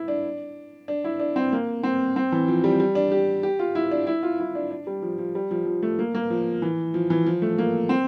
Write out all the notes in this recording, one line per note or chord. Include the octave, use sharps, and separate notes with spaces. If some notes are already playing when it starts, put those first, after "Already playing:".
Already playing: E4
D4
D4
E4
D4
C4
A#3
C4
C4
E3
F3
G3
G3
D4
G4
G4
F4
E4
D4
E4
F4
E4
D4
D4
G3
F3
F3
G3
F3
F3
A3
A#3
A#3
F3
E3
F3
E3
F3
A3
A#3
C4